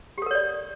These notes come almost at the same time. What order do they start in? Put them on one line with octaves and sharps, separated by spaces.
G4 A4 A#4 C#5 D5